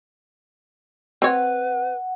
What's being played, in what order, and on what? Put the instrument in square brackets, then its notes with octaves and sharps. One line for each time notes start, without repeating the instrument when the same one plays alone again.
[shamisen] C4 C#5 [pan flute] B4 [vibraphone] F#5